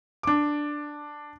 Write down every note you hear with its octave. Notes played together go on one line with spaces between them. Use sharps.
D4 D6